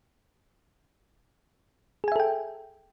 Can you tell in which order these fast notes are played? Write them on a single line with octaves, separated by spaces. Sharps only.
G#4 G#5 E5 A4 G5